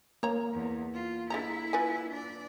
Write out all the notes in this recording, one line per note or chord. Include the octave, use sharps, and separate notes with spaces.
A#3 C#5 A#5
E2
F4
D3 G#3 E4 E5 A#5
F4 B4 G#5
D4 D5